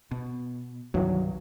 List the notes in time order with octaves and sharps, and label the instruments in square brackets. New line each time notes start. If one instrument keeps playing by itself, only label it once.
[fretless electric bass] B2
[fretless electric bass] C2 G2 [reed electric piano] D#3 E3 F#3